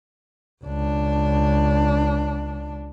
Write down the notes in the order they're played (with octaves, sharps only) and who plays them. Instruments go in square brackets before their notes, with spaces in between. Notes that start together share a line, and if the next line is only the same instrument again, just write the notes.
[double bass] C#2 D4